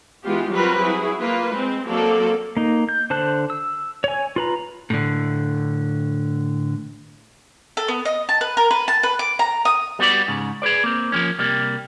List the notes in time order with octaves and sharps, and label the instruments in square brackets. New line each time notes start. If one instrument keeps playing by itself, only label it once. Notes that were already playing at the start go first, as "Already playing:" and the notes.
[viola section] E3 G#3 B3 F4 G4
F#3 G3 C4 F4 A#4 B4
F#3 E4 G#4
A#3 F4 B4
G#3 C4
F#3 A#3 C4 A4 D5
[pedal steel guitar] A#3 D#4
G6
D3 C5 A5 F#6
E6
C#5 G#5
F4 B4 A#5
[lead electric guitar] A2 D3
[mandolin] A4
B3
D#5
A5
B4
A#4
B4
A5
B4
D6
A#5
D#6
[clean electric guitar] G3 B3 F#4 C#5 D5
G#2 C#3
G#4 B4 C5 D5
A#3 C4
F3 F#3 A#3 C#4
C3 G3 A#3